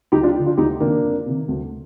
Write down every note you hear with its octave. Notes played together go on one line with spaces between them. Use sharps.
D2 D#4 G4
D4 F4
D3 F3
D4 F4
D2 D#4 G4
C3 D#3 A#3 D4
F2
C3 D#3
D2